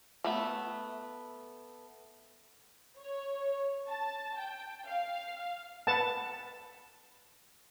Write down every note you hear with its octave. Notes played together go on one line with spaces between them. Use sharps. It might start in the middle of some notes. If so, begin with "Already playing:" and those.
A3 B3 E5
C#5
A5
G5
F5
B4 F#5 A5